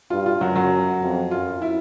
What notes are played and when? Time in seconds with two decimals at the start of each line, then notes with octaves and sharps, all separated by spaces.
0.10 G2 F4
0.26 F4
0.41 F#2 F#3 F#4
0.56 F#3 F#4
1.02 F2
1.31 F#2 F4
1.62 E4